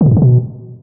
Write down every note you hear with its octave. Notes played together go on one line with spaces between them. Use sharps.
D3
A#2
G2
C#3
B2